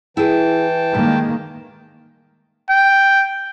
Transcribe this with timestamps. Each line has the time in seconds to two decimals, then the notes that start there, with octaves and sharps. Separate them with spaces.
0.17 E3 E4 G#4 G5 A5
0.94 D#3 G3 G#3 A#3
2.70 G5